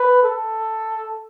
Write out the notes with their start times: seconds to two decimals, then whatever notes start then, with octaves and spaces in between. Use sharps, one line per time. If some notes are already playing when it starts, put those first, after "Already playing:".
Already playing: B4
0.23 A4